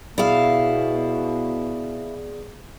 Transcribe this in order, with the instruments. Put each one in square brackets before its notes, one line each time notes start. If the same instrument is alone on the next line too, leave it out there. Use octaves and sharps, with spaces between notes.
[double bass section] B2 [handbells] B3 G#4 D5 [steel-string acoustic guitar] E4 F5